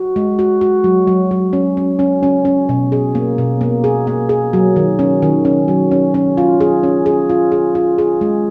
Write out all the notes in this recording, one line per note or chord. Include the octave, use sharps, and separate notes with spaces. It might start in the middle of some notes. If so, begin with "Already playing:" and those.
Already playing: F#4
G#3
F#4
F#4
F#3
F#3
F#3
C#4
C#4
C#4
C#4
C#4
B2
G#4
A#3
B2
A#3
G#4
A#3
G#4
F#3
D#3
C#4
D#3
C#4
F#3
C#4
C#4
F4
G#4
C#4
G#4
F4
G#4
F4
G#4
G#3